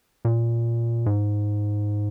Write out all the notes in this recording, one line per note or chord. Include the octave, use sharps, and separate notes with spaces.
A#2
G#2